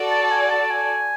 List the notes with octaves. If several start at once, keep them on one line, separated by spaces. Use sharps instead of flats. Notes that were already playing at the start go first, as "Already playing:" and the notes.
Already playing: F#4 A4 D5
A5
G#5
A5
G#5